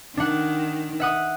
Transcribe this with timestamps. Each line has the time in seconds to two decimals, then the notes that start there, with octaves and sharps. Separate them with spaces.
0.17 D#3 D4 F#5
1.00 E5 F#5 D#6